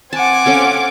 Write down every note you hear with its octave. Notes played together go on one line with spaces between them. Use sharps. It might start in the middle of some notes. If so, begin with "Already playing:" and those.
C4 F#5 G#5 A5 D6
C#4 A4 F5